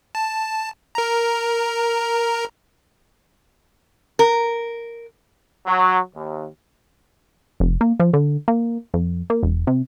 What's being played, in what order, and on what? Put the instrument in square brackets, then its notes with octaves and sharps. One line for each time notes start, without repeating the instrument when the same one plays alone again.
[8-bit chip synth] A5
A#4 A#5
[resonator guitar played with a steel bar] A#4
[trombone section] F#3
D#2
[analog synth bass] F1
A#3
F3
D3
A#3
F2
A#3
E1
C3